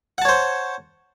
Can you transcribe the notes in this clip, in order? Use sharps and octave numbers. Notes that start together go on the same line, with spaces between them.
C5 C#5 F#5 A5